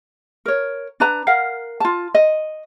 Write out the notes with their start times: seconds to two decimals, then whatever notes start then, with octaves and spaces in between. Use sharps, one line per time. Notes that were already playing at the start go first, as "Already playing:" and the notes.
0.46 A#4 C#5
1.00 D4 B4 A#5
1.27 A#4 F5 F#5
1.80 F4 A5
2.15 D#5